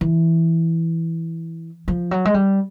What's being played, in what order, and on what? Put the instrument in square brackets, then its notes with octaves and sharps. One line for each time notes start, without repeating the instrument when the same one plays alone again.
[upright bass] E3
F3
F#3
G#3
G3